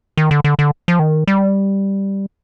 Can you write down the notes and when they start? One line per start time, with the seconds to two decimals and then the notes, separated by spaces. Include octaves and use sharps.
0.17 D#3
0.31 D3
0.44 D3
0.59 D3
0.88 F3
0.99 D#3
1.28 G3